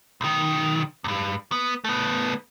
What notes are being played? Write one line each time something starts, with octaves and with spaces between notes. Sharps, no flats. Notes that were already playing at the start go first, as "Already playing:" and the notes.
B1 D#3
E2 G2
B3
A3 B3